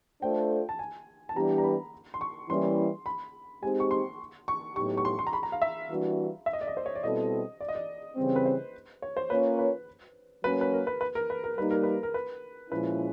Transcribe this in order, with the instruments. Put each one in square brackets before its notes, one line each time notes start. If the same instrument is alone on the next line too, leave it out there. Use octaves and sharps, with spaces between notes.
[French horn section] A3 D4 F4 A4 C5 [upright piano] G5
[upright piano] A5
G#5
A5
[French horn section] E3 G3 B3 D4 G4 [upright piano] A#5
[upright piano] A#5
B5
C6
C#6
[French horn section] E3 G3 A#3 C#4 E4 [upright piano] C6
[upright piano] B5
[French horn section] G#3 C4 D#4 G4 [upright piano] G#5
[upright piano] C#6
C6
C#6
[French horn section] A2 F#3 B3 D#4 G4 [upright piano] C#6
[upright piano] C#6
C6
C6
A#5
B5
A#5
F5
E5
[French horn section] E3 G3 A#3 D4 F#4
[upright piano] E5
D#5
D5
D#5
C5
C#5
D5
[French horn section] B2 G3 C4 E4 A4 [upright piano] D#5
[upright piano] D5
D#5
D5
[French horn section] C#3 E3 G3 C4
[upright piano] B4
C5
C#5
C5
[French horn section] A#3 C#4 F4 A#4 C#5 [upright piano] B4
[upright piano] B4
[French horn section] F#3 A#3 C#4 [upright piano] B4
[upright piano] B4
A#4
B4
B4
A#4
B4
A#4
[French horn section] G3 A#3 D#4 [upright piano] B4
[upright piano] A#4
B4
A#4
B4
[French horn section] A#2 F3 G#3 C#4 E4 [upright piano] B4